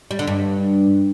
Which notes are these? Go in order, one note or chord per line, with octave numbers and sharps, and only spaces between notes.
G3
D3
G2